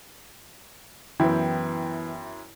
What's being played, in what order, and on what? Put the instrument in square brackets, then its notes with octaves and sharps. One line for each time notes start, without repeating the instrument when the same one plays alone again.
[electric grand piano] F#2 E4 G5 [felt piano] E3 B3